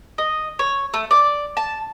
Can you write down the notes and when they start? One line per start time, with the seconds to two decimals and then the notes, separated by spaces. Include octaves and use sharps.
0.18 D#5
0.59 C#5
0.94 A3
1.11 D5
1.57 A5